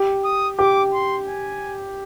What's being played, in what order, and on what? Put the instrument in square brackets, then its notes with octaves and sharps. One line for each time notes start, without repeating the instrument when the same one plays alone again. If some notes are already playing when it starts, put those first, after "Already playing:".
Already playing: [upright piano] G4
[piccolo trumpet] D#6
[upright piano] G4 [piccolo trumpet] D6
[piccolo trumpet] C6
G#5